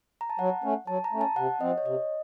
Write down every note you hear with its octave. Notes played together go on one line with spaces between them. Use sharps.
A#5
A5
F#3 F#5
A3 C#4
F#3 A5
A#5
A3 C#4
A5
C3 F#5
F3 C4 D#5
C#5
C3 D#5